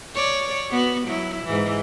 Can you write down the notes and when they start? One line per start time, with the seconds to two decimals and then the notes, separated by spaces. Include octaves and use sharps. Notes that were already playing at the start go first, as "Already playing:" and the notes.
0.15 C#5 D5
0.71 B3 F#4
1.08 F#3 E4
1.45 G#2 E3